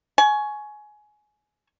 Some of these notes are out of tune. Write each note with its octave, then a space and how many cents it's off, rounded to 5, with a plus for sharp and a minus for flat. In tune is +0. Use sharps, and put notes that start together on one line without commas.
G#5 +20 C#6 +5